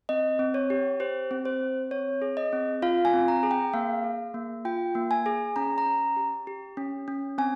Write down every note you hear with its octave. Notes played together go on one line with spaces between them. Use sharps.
C4 D#5
C4
C#5
G4
G4 C5
C4
C5
C4
C4 C#5
G#4
D#5
C4
F4 F5
G#5
C4
A#5
G#4
G5
A#3 F5
G#4
A#3
F4 G5
A#3
G#5
G#4
C#4 A#5
A#5
C#4
G4
G4
C#4
C#4
C4 G#5